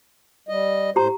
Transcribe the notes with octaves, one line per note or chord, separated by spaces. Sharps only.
G3 D#5
A2 G4 C5 A#5